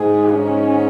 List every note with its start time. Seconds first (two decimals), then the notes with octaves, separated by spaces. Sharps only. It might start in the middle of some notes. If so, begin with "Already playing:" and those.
Already playing: G#2 G#4
0.33 G#2 C#4